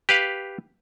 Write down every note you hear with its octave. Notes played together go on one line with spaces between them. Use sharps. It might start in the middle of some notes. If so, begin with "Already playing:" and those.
G4 B4 F5